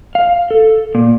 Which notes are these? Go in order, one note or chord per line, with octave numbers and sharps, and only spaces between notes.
F5
A4
A#2